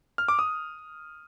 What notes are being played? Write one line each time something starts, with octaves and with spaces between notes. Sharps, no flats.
F6
D6
D#6